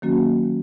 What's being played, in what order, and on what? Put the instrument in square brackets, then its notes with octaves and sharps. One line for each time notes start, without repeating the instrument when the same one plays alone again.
[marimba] D#3 F#3 A#3 C#4 F#4